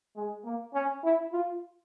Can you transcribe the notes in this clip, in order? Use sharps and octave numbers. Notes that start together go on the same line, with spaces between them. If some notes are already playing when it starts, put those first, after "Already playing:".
G#3
A#3
C#4
E4
F4